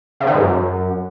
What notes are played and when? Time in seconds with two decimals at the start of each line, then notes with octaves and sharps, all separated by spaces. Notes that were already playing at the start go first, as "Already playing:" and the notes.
0.20 C#3
0.27 D#3
0.34 G#2
0.40 F#2